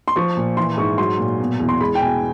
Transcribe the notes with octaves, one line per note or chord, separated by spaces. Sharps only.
C6
F3 C#6
A#2
E3 C6
G#2 C#6
F#3 C6
A#2
B2
E2
C6
G#3 B5
G5
B2 G#5